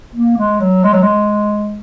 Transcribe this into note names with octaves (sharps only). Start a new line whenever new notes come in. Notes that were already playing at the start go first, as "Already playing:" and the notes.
A#3
G#3
F#3
G#3
F#3
G#3